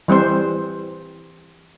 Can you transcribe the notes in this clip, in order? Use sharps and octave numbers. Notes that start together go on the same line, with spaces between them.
E3 G3 C4 C5